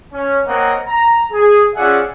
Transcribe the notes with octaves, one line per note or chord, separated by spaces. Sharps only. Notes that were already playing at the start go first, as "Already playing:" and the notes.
C#4
A#3 C4 A#4 C#5 D#5 F#5
A#5
G#4
C#4 F4 G#4 D5 E5 F#5